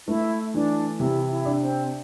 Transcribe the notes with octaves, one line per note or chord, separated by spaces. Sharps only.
A3 E4
E3 D4
C3 E4
E4
D4
C4